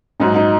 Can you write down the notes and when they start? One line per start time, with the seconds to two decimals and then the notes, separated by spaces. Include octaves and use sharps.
0.20 A#1 G#2 F#3 D#4
0.36 D#4